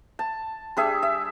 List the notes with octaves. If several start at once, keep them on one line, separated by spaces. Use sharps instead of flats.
A5
G3 D4 G#4 E5
E5